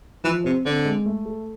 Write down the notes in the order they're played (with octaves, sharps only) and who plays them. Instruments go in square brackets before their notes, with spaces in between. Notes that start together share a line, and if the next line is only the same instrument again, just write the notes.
[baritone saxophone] E3 [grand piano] F3
[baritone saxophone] C3 [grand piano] C4
[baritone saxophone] D3 [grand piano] C4
[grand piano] G#3
A3
A4